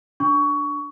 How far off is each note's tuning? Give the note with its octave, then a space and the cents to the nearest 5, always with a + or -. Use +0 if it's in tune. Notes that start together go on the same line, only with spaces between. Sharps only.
D4 +0 C#6 +20